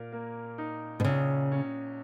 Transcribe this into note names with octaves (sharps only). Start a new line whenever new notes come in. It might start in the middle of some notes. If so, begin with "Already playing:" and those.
Already playing: A#2 A#4
A#3
D#4
B2
A#1 C#3
C#4